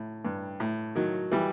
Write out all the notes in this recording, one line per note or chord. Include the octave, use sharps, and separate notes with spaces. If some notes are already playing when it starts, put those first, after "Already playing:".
Already playing: A2
G2
A2
D#3 F#3
E3 G3